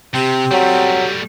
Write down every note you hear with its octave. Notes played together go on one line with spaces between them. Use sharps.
C3 C4 G4
F#3 G3 A3